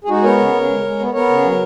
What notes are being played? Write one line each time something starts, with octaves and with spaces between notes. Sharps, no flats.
G#4
G#3 D#4 F#4
B3 A#4 C#5
C#3
C#3
G#3
G#3
B3
B3 A#4 C#5
C#3
F#3